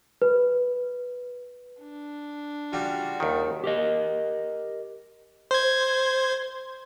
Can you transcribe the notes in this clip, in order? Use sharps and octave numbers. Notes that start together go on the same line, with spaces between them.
B4
D4
C#3 G3 F4 F#4
D#2 D#3
G4 A#4 D#5
C5 G#6